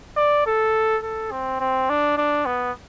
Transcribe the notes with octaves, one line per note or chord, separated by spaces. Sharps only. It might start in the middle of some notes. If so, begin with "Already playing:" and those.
D5
A4
A4
C4
C4
D4
D4
B3